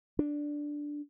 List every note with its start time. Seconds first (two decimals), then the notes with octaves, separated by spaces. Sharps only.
0.19 D4